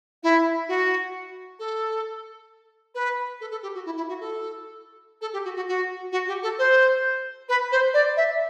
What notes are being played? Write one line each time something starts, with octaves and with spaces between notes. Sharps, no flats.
E4
F#4
A4
B4
A4
A4
G4
F#4
E4
E4
F#4
A4
A4
G4
F#4
F#4
F#4
F#4
G4
A4
C5
B4
C5
D5
E5